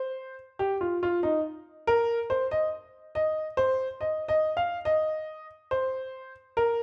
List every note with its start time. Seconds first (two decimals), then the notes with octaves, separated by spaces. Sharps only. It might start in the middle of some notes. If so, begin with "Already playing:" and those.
Already playing: C5
0.59 G4
0.81 F4
1.03 F4
1.23 D#4
1.87 A#4
2.30 C5
2.51 D#5
3.15 D#5
3.57 C5
4.01 D#5
4.28 D#5
4.57 F5
4.85 D#5
5.71 C5
6.57 A#4